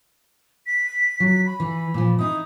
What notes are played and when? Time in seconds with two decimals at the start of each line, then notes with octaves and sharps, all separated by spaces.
0.67 B6
1.20 F#3
1.46 B5
1.60 E3
1.94 A#2 F3
2.19 D#4 E4 D#6